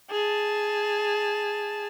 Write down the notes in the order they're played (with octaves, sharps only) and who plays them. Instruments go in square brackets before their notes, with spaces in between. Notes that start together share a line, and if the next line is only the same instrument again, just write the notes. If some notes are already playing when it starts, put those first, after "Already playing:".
[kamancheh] G#4 A5